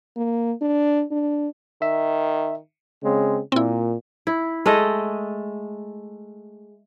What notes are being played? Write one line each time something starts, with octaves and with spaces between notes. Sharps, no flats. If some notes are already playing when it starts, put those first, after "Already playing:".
A#3
D4
D4
D#3 E5
C#3 G#3 C4
A#2 C4 E4
E4
G#3 A3 A4 D#5